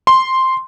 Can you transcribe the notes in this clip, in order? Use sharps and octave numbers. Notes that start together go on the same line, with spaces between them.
C6